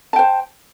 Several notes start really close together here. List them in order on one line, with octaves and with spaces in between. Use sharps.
A5 G5 C5